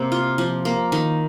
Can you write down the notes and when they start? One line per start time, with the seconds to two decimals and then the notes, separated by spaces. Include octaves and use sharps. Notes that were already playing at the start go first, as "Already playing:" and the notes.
Already playing: C3 A#3
0.12 F4
0.38 F3
0.65 A#3
0.92 D#3